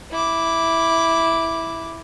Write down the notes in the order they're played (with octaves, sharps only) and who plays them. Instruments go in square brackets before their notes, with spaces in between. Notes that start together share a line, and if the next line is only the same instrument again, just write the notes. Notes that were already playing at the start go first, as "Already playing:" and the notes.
[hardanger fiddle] E4 D6